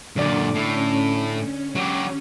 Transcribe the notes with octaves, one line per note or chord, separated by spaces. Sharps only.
F#2 A#2 D3 D5
A2 C#4
F#3 G4